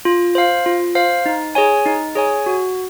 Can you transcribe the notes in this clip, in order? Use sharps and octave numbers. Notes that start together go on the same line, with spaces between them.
F4
C5 F5
F4
C5 F5
D#4
G#4 C#5 G#5
D#4
G#4 C#5 G#5
F#4